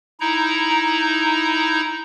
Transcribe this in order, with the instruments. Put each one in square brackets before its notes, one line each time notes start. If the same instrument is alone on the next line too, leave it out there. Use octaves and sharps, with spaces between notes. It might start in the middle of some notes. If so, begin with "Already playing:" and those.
[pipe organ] D#4 E4 A#5